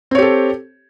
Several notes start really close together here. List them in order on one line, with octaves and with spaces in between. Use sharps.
C4 C#5 G4 A4